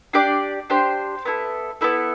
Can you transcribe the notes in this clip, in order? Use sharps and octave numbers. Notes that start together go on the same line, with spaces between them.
D4 G4 D5
D4 G4 C5
B3 E4 A4
B3 E4 A4